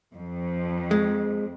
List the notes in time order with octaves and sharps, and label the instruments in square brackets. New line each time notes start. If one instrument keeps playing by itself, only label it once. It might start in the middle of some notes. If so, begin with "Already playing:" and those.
[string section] F2
[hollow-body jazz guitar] G#3